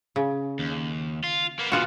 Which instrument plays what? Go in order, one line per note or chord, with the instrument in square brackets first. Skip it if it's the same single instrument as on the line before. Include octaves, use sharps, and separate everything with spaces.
[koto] C#3
[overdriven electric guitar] D#2
F4
A#3 B3
[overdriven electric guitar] A#2 E3 [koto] B3 F4 F#4